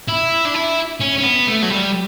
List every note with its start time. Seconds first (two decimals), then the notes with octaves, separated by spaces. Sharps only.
0.08 E4
0.45 D4
0.54 E4
1.00 C#4
1.18 C#4
1.23 B3
1.47 A3
1.62 F#3
1.70 G3